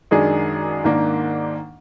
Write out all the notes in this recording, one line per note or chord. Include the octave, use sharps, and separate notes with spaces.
F#2 D#3 G#3 D4 G#4
G#2 D#3 A#3 D4